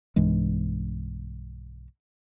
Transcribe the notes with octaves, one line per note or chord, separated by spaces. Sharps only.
B1 G2 E3 G#3